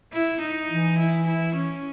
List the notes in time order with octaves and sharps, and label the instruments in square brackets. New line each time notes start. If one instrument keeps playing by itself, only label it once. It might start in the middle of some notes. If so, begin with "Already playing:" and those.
[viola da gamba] E4
D#4
[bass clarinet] E3
[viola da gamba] E4
E4
C#4